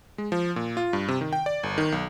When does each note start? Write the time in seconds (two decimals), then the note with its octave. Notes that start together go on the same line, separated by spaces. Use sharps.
0.18 G#3
0.32 F3
0.56 A#2
0.77 F4
0.93 G2
1.08 C3
1.21 D#3
1.33 G5
1.46 D5
1.63 G1
1.78 D#3
1.92 B1